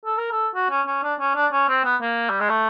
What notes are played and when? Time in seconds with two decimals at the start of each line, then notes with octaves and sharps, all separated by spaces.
0.05 A4
0.18 A#4
0.31 A4
0.55 F#4
0.70 C#4
0.87 C#4
1.03 D4
1.20 C#4
1.35 D4
1.53 C#4
1.69 C4
1.85 B3
2.01 A#3
2.30 G3
2.40 G#3
2.50 A3